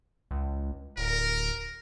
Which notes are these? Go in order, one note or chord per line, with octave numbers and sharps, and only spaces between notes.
C#2
D1 A#4